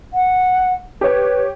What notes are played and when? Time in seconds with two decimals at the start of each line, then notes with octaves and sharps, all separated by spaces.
0.14 F#5
1.01 G4 B4 C#5